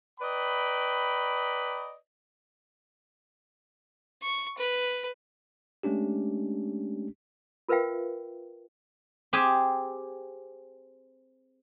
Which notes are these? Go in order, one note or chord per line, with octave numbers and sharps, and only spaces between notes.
B4 D5 D#5 G5 A#5 B5
C#6
B4
G#3 A3 C#4 D4 G4
F4 A#4 B4 E5 F5 G5
C4 G4 G#4 G#5